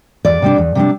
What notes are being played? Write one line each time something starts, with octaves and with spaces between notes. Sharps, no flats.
E2 D5
C3 G3 D4
E2
C3 G3 D4